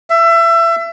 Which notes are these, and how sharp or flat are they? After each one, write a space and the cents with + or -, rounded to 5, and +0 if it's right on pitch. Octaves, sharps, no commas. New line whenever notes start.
E5 +25